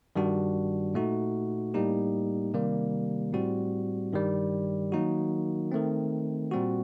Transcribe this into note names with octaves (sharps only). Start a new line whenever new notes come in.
G2 D#3 G3 D4 F#4
A#2 A3 D#4 F#4
A2 G3 A#3 D#4 G4
C3 D#3 G3 A#3
A2 G3 C4 F#4
G2 D#3 G3
D#3 F#3 A#3 D#4 F#4
D#3 A3 C4
A#2 G3 C4 F#4